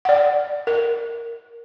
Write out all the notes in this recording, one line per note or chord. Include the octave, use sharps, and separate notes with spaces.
D5 F#5
A#4